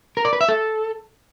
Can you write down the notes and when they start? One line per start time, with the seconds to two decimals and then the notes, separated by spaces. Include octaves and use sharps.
0.17 A#4
0.25 D5
0.33 B4
0.41 E5
0.49 A4